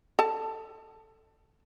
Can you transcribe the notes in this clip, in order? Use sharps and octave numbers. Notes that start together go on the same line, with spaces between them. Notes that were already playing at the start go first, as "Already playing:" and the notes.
A4 A5